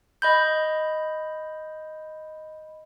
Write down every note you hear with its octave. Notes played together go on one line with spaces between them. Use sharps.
D#5 B5 G6